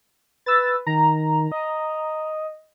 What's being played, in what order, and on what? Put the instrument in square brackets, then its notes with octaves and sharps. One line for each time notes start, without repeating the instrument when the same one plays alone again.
[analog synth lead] B4 [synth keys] E6 A6
[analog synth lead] D#3 [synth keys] A#5
[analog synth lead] D#5